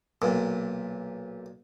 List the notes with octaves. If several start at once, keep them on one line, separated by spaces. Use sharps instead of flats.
B1 A#2